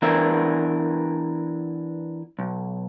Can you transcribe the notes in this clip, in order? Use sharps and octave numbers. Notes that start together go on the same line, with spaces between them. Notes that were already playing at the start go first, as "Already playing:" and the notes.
E3 B3 D4 A#4 E5
B1